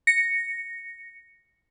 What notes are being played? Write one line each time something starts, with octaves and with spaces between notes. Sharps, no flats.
A#6 C#7